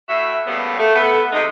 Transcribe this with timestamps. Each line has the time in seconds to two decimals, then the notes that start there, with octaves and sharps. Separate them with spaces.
0.09 A2 F#4 E5
0.47 A2 C#3 G3 A#3 B3
0.79 A3
0.96 B3 A4
1.32 C3 D#3 G#3 D#4